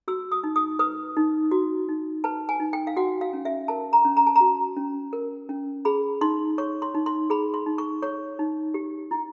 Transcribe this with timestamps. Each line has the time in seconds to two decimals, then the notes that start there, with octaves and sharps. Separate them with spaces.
0.08 F#4 E6
0.32 D#6
0.44 D#4
0.56 D#6
0.79 B4 D#6
1.17 D#4
1.51 F#4
1.89 D#4
2.24 B4 A5
2.49 G#5
2.60 D#4
2.73 G5
2.87 F5
2.97 F#4 F#5
3.21 F5
3.33 C#4
3.45 E5
3.68 A#4 A5
3.93 A#5
4.05 C#4
4.17 A#5
4.27 A5
4.36 F#4 A#5
4.77 C#4
5.13 A#4
5.49 C#4
5.85 G#4 B5
6.21 D#4 C6
6.58 C#5 C#6
6.82 C6
6.95 D#4
7.06 C6
7.30 G#4 B5
7.54 C6
7.66 D#4
7.78 C#6
8.02 C#5 C#6
8.39 D#4
8.74 G4
9.11 E4